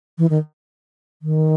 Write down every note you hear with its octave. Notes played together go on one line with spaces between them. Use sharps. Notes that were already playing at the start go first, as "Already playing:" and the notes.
E3
D#3
D#3